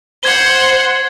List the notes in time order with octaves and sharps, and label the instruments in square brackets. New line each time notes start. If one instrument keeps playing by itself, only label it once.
[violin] C5 F#5 [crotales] G#6 G7